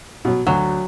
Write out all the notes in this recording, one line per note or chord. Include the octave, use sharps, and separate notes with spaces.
B2 F#3
D2 F#3